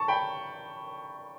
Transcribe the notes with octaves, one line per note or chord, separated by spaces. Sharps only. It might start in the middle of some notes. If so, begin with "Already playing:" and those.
Already playing: A5 C#6
G5 B5